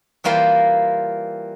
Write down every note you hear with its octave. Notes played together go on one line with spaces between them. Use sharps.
E3 G3 A#3 F4 C5